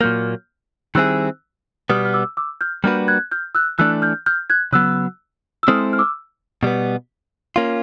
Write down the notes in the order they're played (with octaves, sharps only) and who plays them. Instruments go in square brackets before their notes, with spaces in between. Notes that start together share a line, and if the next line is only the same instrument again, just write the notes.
[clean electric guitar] A#2 F#3 A#3 [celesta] F6 G6
[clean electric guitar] D#3 G3 C4 E4 G#4 [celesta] E6 F#6
[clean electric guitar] B2 G3 B3 [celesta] D#6 F6
[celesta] F6
D6 E6
D6 E6
F6 G6
[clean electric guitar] G3 A#3 D4 F#4 B4 [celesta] F6 G6
[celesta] F#6 G#6
F6 G6
E6 F#6
[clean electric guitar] E3 A3 D4 [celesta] E6 F#6
[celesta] F6 G6
F6 G6
F#6 G#6
[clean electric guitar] C#3 F#3 B3 [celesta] E6 F#6
[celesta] E6
[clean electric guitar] G#3 C4 E4 A4 C5 [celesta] D#6 F6
[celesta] F6
D6 E6
[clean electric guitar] B2 G3 B3
A#3 C#4 F4